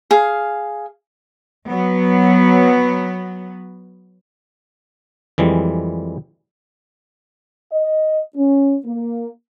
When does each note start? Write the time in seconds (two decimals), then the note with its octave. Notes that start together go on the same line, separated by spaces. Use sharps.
0.11 G#4 F5
1.67 F#3 B3
5.38 F2 E3 G3 G#3
7.72 D#5
8.36 C#4
8.86 A#3